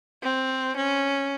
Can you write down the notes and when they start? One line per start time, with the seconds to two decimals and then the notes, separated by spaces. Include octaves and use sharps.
0.23 C4
0.77 C#4